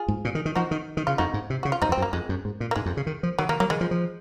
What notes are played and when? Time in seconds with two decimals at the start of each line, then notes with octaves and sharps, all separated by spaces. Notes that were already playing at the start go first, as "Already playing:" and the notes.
Already playing: F4 G#4
0.08 G#2
0.25 A#2
0.35 D#3
0.45 D#3
0.55 F3 D#4 F#4
0.71 D#3
0.97 D#3
1.07 C#3 F4
1.18 F2 D#4 F#4
1.34 G#2
1.50 C3
1.63 C#3 F#4
1.72 F4
1.82 F#2 C4 D#4
1.89 F2
1.92 C4
1.97 F#2
2.02 A#3
2.13 F2 G#3
2.29 F#2
2.45 G#2
2.60 A#2
2.71 A#3
2.76 G#2 G#3
2.86 F2
2.97 C#3
3.07 D#3
3.23 F3
3.38 D#3 F#3
3.49 D#3 A#3
3.60 F#3 A#3
3.70 D#3 G#3
3.81 F3
3.91 F3